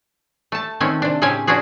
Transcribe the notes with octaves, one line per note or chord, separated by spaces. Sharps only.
A3 A5
D#3 A3 C4 C#4
C3 D4
A2 C#3 C4 C#4 G4 G#5
C#4 D4 F4 F#4 G#4